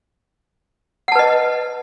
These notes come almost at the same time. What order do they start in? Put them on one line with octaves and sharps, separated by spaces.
F#5 A5 B4 D#5